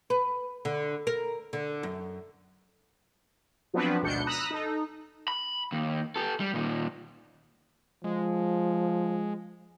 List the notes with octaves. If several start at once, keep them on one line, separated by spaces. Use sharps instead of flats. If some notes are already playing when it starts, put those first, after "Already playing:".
B4
D3
A#4
D3
F#2
F3 F#3 B3 C4 D4 B4
G#1 D2 B2 D4 G6 C#7
A#5 B5 D#6 E6 F#6 A#6
D#4 A4
B5
D#2
G4 A4
G3
A#2 D#3
F3 G#3